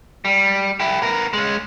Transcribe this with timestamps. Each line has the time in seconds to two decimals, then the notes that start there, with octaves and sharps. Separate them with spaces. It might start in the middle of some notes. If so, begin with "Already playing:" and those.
0.25 G3
0.80 E4 G4
1.02 B3 A#4
1.33 G#3 C#4